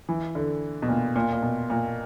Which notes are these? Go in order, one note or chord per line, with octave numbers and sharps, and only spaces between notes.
E3
D3
B2
A#2
A#2
A#2
B2
A#2